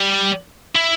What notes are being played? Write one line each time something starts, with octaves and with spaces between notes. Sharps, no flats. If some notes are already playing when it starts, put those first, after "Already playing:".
Already playing: G3
E4